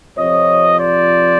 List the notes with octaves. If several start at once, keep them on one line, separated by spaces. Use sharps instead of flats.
F2 C3 F3 C#5 D#5
C5 D5